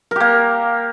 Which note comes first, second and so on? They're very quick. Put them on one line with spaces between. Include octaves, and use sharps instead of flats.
A#4 G4 A#3